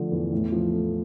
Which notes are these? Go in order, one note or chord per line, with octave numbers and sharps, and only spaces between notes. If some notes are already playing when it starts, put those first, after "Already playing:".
Already playing: D3 F3 A3
E2
A2
F3
A3